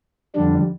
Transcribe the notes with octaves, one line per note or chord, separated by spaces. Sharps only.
F2 D3 G3 D4